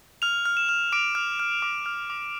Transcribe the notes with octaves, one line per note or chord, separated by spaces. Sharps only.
F6 F7
F6
E7
F6
D6 D7
F6
F6
D6
F6
D6